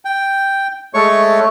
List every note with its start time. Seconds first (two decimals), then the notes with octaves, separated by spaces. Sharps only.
0.05 G5
0.94 G#3 A3 C#5 C#6